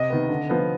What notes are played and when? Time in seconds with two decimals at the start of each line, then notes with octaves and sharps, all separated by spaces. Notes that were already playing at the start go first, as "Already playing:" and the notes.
Already playing: C3 D#5
0.10 D#3 B3
0.29 D3
0.49 F3 B3